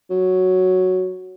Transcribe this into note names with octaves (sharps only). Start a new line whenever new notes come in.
F#3